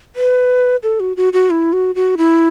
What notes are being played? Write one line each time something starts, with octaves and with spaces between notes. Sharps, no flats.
B4
A4
F#4
F#4
F#4
E4
F#4
F#4
E4